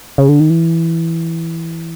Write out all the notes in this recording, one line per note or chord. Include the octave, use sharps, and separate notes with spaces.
C#3
D3
D#3
E3